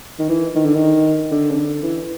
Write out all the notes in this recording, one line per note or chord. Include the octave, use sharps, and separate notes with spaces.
D#3
E3
D#3
D3
D#3
D3
C#3
D3
E3